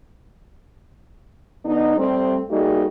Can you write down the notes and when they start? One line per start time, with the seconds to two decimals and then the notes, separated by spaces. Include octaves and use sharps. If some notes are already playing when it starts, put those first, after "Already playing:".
1.65 D3 B3 D4 D#4
1.97 G3 A3 C4
2.50 G3 A3 A#3 D#4 F#4 G#4